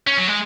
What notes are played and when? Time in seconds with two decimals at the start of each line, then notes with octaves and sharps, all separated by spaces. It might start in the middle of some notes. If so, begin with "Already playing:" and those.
0.07 C#4
0.18 F#3
0.28 G#3